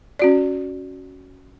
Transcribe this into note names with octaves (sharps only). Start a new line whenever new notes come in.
C#4 F#4 D5